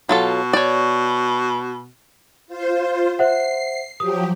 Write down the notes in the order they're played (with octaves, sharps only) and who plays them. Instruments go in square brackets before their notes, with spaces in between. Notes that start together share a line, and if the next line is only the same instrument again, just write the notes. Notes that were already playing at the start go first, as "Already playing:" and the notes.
[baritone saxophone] B2 [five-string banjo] F#3 F4 A4
[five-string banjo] C#5 D5
[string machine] F4 C5
[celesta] C5 E5 F#5 [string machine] C7
[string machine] F3 F#3 G4 [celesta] D#6